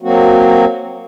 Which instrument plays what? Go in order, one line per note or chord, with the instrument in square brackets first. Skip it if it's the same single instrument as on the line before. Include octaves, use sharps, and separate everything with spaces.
[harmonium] F#3 A#3 C4 F#4